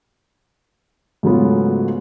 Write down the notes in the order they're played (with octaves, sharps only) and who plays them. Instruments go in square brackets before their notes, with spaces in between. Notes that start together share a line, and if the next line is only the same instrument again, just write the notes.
[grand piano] G#2 C#3 F#3 A3 B3 F4